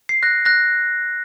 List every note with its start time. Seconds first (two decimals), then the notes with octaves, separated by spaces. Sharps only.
0.09 C7
0.23 F#6 A#6
0.45 F#6 A#6